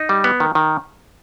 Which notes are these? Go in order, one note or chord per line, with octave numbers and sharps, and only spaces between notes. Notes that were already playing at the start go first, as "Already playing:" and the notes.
Already playing: D#4
G3
B3
D#3
D#3